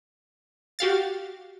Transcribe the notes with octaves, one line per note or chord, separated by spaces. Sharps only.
F#4 G4 F5 A6